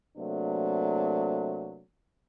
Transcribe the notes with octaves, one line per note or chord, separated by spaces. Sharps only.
C3 F#3 A3 A#3 D4